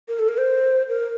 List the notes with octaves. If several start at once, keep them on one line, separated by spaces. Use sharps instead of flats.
A#4
A4
A#4
C5
A#4